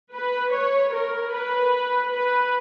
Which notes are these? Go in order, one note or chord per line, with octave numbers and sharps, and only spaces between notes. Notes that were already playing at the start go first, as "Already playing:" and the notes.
B4
C#5
A#4
B4
B4